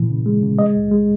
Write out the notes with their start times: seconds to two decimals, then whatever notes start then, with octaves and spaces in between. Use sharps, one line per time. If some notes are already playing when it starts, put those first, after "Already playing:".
Already playing: A#2 E3
0.10 C#3
0.26 G#3
0.43 C#3
0.59 G#3 D#5
0.76 C#2
0.91 G#3